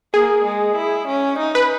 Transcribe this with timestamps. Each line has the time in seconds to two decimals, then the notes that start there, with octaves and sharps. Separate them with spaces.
0.14 A#3 G#4
0.45 G#3
0.77 E4
1.08 C#4
1.39 D#4
1.55 B4